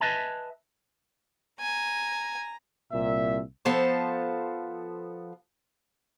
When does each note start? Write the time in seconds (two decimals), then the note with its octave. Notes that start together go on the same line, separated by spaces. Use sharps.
0.01 B4 D#5 E5 G#5 A5
1.60 G#5 A#5
2.93 C2 A#2 E5
3.65 F3 B3 A4 C5